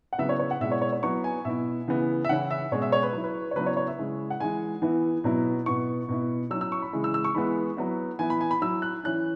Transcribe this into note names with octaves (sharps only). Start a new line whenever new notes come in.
F#5
C#3 F#3 B3 E4 E5
C#5
C#5
F#5
B2 G#3 E4 E5
C#5
C#5
C#5
F#3 B3 E4 C#6
G#5
B2 B3 E4 E5
C#3 E3 B3 E4
E5
C#3 E3 C#4 E4 F#5
E5
B2 G#3 C#4 C#5
E5
C#5
B4
F#3 E4
B4
C#5
C#3 F#3 B3 E4 B4
C#5
C#5
E5
C#3 G#3 E4
F#5
E3 G#3 E4 G#5
E3 B3 E4
B2 F#3 B3 E4
B2 B3 E4 C#6
B2 B3 E4
F#3 C#4 E4 E6
E6
C#6
B5
C#3 E3 G#3 E4
E6
E6
C#6
E3 G#3 B3 E4 B5
F#3 B3 E4
E3 B3 E4 G#5
B5
G#5
B5
F#3 E4 E6
F#6
E3 C#4 E4 F#6